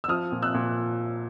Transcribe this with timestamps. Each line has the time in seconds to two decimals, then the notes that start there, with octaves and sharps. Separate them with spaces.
0.04 E6
0.08 F3 D#6 F6
0.32 A#2
0.43 E6 F#6
0.54 A#2